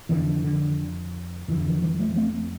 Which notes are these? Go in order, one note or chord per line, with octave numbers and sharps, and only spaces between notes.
F2 D3 E3
D3
F2 D3 E3
E3
E3 G3
F3 A3
A3 C4